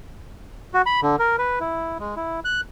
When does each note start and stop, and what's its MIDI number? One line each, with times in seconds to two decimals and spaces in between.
0.74 0.82 66
0.86 1.00 83
1.03 1.16 50
1.19 1.36 70
1.38 1.59 71
1.60 1.98 64
2.00 2.15 56
2.16 2.40 64
2.45 2.61 90